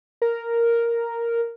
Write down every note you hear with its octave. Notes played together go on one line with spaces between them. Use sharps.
A#4